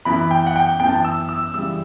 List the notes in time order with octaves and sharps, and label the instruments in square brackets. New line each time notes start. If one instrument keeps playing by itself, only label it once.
[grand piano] F#2 E3 B3 B5
G5
F#5
G5
F#2 E3 B3 G5
A5
G5
E6
E6
F#2 C#3 E3 G3 E6